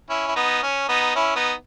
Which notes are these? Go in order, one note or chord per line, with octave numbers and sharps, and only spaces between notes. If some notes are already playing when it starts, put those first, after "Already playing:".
C#4 E4
E4
B3 D#4
C#4
B3 D#4
C#4 E4
B3 D#4